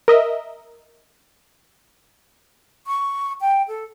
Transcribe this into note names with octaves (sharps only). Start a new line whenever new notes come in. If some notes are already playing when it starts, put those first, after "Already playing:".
A#4 D#5 E5
C#6
G5
A4